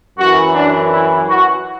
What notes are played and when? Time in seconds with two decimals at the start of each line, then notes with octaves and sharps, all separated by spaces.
0.18 F#2 E3 F#4
0.55 D4
0.92 E4
1.29 F#4